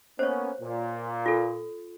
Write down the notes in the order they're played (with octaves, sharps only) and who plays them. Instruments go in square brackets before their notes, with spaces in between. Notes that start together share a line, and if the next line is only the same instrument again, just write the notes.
[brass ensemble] A#3 B3 C#4 [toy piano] C5 C#5
[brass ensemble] A#2
[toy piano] F4 A4